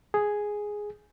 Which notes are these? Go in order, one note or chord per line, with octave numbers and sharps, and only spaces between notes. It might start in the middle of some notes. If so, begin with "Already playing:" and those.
G#4